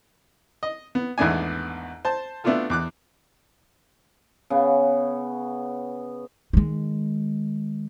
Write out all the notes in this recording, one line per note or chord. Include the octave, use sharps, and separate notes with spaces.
D#5
B3
G#1 E2 A3 B3 D4 G#5
C5 A5
A3 B3 D4 E4 F4 A4
E2 D6 F#6
C#3 B3
D#3 G#3